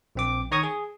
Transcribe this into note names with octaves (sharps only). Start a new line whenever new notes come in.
A#1 C4 D6
D#3 C#5 A#5 C#6 D#6 G#6
G#4